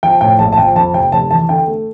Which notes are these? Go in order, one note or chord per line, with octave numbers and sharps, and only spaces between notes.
F3 G5
A2 G5
A#1 A5
A5
F3 G5
F2 A5
F1 G5
F1 A5
E3 A5
D3 G5
A3